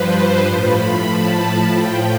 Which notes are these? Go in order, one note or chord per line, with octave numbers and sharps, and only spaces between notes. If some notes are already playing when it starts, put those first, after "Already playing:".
Already playing: G2 F3 B4 C5
A2 F3 B5
A5
A2 F3 G5